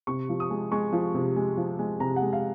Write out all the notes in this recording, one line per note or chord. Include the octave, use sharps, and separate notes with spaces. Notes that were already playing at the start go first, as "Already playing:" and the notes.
C3 C#6
F3
D#6
G#3
G#3 C#6
F3
C3
G#3
F3
G#3
C3 A#5
F#5
G#3
F5